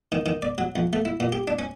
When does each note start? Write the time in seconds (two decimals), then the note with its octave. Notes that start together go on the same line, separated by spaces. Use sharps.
0.12 D#3
0.26 D#3
0.42 D5
0.58 F#3
0.76 F2
0.93 A3
1.05 E4
1.20 A#2
1.32 G4
1.48 D4
1.59 C#4